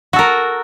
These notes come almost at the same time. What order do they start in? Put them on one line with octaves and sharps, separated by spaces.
F#4 A4 A#4